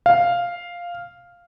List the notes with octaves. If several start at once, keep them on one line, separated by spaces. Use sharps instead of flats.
F5